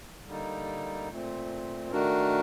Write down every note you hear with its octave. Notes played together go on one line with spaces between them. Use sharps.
D3 G3 A#3 D#4
A#2 A3 C4
D#3 A3 D4 F#4 A#4